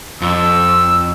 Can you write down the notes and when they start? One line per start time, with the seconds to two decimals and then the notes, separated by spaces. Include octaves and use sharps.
0.22 F2 E6